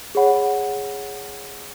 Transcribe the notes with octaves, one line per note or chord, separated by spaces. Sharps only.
G#4 C#5 F#5 B5